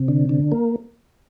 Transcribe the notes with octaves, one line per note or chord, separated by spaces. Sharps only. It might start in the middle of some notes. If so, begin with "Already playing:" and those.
Already playing: C3
D3
D3
A#3